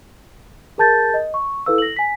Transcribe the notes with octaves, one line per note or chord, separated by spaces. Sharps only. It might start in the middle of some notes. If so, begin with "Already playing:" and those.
G#4 A#4 A5 G6 A6
D#5
C#6
E4 A4 B4 F5 E6
A#6 F#7
G#5 B6